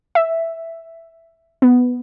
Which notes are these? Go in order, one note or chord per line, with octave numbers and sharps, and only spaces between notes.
E5
B3